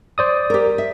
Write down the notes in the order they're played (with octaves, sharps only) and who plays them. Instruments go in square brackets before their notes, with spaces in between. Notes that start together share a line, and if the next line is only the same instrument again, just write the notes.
[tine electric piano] C5 D5 D#6
[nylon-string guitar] G4 A#4
E5